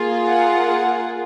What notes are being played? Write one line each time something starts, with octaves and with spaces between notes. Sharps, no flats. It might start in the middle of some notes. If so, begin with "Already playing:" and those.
Already playing: A#3 F4 G#4
F#5